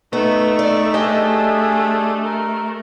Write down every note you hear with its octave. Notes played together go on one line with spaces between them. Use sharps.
A3 B3 D#4 C#6
D5
D4 G4 G#4 D#5 E5
A#4